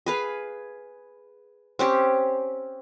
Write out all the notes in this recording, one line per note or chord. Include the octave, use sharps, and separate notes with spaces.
G#4 B4 F5
C4 C#4 G4